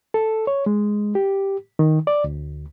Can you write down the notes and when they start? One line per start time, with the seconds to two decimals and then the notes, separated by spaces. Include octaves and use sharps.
0.14 A4
0.47 C#5
0.66 G#3
1.15 G4
1.79 D#3
2.07 D5
2.24 D2